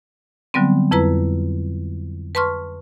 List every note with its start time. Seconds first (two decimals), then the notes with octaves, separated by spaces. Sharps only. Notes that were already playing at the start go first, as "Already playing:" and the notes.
0.54 D3 F#3 G3 B3 C4
0.91 F2 E4 B4 A#5
2.35 B4 A5 C6 C#6 F6